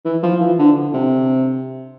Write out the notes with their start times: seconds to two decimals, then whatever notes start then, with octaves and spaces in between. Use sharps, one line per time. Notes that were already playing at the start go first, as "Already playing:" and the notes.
0.05 E3
0.23 F3
0.41 E3
0.59 D3
0.94 C3